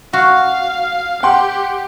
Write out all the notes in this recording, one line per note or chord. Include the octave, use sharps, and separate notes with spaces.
F#4 F5
G4 F#5 G5 C6